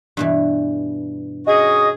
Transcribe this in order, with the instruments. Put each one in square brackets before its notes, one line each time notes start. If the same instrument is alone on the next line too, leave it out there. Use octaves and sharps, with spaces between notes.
[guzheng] G2 B2 E3
[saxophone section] C#4 F#4 G#4 [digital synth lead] D#5